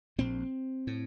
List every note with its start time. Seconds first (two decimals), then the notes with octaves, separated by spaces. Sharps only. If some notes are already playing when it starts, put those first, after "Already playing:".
0.18 A#1 A#2 C4
0.87 A2